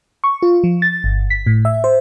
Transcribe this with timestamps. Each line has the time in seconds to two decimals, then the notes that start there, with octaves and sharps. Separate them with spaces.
0.24 C#6
0.42 F4
0.64 F3
0.82 A6
1.04 G1
1.30 B6
1.46 A2
1.65 E5
1.84 C5